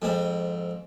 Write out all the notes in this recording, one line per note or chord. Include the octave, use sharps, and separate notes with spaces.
F2 G#2 C4